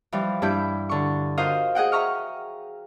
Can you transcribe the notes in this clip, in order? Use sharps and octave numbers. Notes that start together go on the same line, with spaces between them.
E3 F3 G3
G2 E4 G6
D3 C#6
F4 F#4 A#4 C5 D#5 F5
G#4 D#5 F#5 G5
E5 A#5 C#6 F6